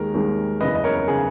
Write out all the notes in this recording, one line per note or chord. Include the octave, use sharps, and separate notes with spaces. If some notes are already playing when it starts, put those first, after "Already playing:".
Already playing: D#2 D#3 G#3 A#4
D#2 D#3 G#3
F#1 E2 C#3 B4 D#5
D#5
A#4 C#5
C#3 G#4